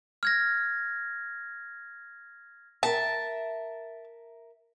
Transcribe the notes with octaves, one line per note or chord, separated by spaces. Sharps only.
F6 G#6 A#6
A#4 E5 A5